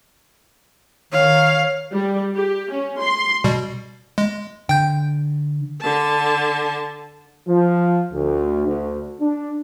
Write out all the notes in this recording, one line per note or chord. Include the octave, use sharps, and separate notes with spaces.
D#3 C#5 F5
G3
G4
C#4
C6
B2 G3
G#3
D3 G5 G6
D3 A5
F3
D2
D2
D4